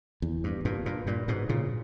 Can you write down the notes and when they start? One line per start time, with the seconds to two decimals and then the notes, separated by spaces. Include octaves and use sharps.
0.22 E2
0.44 G2
0.65 G2 A#2
0.86 G2 A#2
1.07 G2 A#2
1.28 G#2 B2
1.49 A#2 C#3